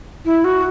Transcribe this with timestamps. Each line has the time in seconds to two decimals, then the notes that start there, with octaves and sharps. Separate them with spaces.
0.25 E4
0.44 F#4